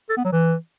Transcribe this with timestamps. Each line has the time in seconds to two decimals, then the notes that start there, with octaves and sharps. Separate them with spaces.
0.09 A4
0.17 B3
0.25 F#3
0.32 E3